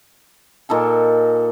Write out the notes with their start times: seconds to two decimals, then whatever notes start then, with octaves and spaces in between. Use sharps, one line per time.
0.69 A#2 D#4 A4 G#5